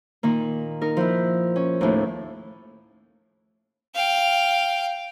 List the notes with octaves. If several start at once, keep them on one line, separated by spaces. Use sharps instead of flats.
A#2 D#3 A#3
D#4 A#4
F3 E4
C#4
D#2 A2
F5 G5